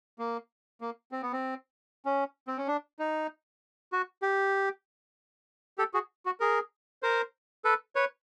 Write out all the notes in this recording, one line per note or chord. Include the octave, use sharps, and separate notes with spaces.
A#3
A#3
C4
B3
C4
C#4
C4
C#4
D4
D#4
F#4
G4
G4 A4
F#4 G#4
F#4
G#4 A#4
A#4 C5
A4 B4
B4 C#5